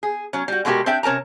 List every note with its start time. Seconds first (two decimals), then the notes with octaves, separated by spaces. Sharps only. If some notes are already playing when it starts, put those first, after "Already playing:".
0.03 G#4
0.33 F#3 C#4
0.48 G3 F#4
0.65 B2 G#3 A3 F#4 G4 A#4
0.86 C4 D4 E5 G5
1.03 C3 C#4 A#4 A5 A#5